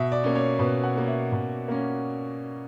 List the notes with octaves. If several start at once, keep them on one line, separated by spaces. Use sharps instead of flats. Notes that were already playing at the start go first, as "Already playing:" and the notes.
Already playing: B2 E5
D5
A#3 C#4
C#5
B2 B4
F#5
A#3 C#4
E5
B2
A#3 C#4